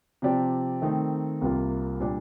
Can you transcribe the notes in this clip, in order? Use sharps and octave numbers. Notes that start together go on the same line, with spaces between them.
C3 F3 C4 G4 D5
D#3 A3 C4 D#4
C2 C3 G3 A#3 F4
A#2 G3 D4